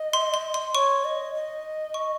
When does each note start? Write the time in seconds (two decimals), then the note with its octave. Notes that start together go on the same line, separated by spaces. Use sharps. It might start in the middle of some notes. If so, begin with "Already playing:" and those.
Already playing: D#5
0.13 C6
0.34 C6
0.54 C6
0.75 C#5 C#6
1.05 D#5
1.34 D#5
1.94 C#6